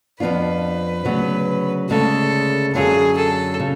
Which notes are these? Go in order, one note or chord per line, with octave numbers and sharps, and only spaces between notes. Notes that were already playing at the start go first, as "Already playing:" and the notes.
F2 F3 B3 D4 F4 B4
D2 C#3 F#3 B3
D2 C#3 G#3 A4
F#2 D3 F#3 C#4 F4 G#4
A4
C#3